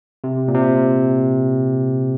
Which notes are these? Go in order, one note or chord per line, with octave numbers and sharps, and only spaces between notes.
C3
A#2
C3